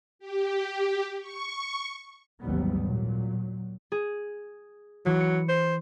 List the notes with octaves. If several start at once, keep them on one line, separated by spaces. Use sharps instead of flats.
G4
C#6
A1 D#2 G#2 F#3 G3 B3
A#2 F#3
G#4
E3 F#3
C#7
C5